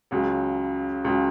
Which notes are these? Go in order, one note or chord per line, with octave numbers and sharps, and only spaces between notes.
C#2 C#3 F#3
C#2 C#3 F#3